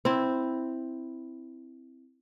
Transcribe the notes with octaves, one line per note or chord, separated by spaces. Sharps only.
C4 E4